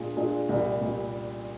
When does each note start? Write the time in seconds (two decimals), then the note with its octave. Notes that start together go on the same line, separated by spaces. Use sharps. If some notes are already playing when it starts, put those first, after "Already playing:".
Already playing: A#2 G#3 D4 F4 G#4
0.16 A#2 G#3 D4 F4 G#4
0.49 C2 A#2 G3
0.81 C2 A#2 G3